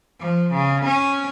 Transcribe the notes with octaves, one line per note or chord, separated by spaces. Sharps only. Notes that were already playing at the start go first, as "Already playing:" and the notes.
F3
C#3
C#4